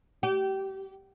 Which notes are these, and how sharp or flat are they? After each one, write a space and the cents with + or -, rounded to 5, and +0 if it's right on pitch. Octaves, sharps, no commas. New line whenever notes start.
G4 -25